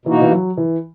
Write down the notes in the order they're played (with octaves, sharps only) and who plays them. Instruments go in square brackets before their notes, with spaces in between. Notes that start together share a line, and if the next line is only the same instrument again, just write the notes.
[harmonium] B2 A#3 D#4 F#4 [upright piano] E3
[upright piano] E3
F#3
E3